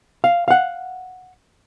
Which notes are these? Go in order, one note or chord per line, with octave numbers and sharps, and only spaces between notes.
F5
F5 F#5